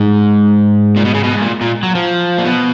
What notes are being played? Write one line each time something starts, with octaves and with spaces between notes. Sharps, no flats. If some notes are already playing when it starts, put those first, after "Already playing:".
Already playing: G#2
A#2
B2
C#3
B2
G#2
A#2
A#2
F#3
F3
A#2
B2